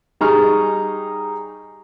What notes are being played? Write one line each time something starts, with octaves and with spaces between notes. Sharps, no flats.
G3 D#4 G#4 A#5 C#6 F6